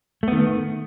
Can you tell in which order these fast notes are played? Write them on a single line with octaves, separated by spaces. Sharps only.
A3 B3 D#3